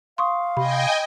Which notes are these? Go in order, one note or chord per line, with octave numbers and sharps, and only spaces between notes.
F5 C6 C#6 D#6
C3 D#5 G5 G#5 B5